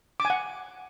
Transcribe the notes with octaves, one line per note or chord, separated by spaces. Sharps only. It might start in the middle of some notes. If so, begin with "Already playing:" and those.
D6
G#5
F#5